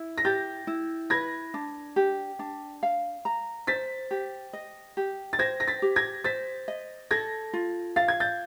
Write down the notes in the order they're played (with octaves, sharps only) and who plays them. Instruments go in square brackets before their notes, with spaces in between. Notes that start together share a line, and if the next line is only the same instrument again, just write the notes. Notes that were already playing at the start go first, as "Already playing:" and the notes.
Already playing: [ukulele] E4
[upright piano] A#6
[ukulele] G4 [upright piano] G6 A6
[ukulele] E4
[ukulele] B4 [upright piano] G#6 A#6
[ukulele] D4
G4
D4
F5
A#5
[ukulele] C5 [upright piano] A6 B6
[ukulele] G4
D#5
G4
[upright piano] A6
[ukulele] C5 [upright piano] G#6 A#6
[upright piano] A#6
A6 B6
[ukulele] G4
[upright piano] G#6 A#6
[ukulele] C5 [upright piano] A6 B6
[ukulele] D#5
[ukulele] A4 [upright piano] G#6 A#6
[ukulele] F4
[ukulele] F5 [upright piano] A6
[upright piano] G#6
G6 A6